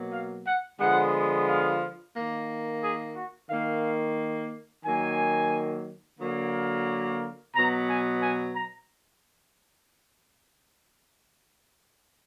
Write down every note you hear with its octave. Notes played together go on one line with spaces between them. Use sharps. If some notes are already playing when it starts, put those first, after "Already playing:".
Already playing: B2 F#3 A#3
F5
F#5
D3 F3 G#3 B3 F#5
F5
D#3 A#3
G#4
F#4
D#3 A#3 F5
D#3 F#3 A#3 G#5
D3 F#3 A#3
B2 F#3 B3 A#5
G#5
G#5
A#5